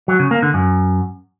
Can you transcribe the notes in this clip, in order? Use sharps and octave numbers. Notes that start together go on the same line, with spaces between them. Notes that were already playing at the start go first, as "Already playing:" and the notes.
F#3
C#3
A#3
D3
F#2